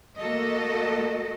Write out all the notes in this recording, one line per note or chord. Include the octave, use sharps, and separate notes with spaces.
A3 A#3 F#4 A4 D#5